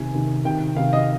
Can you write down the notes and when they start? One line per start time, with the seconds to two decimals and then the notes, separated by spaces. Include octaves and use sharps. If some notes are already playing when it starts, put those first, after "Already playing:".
Already playing: C3 D#3 G#5
0.14 C3 D#3
0.45 C3 D#3 G5
0.76 C3 D#3 F5
0.93 D#5